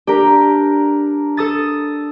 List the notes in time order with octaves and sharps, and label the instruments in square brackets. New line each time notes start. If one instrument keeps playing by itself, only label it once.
[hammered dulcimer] D4 A#4 [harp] G4
[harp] A4 D#6 A6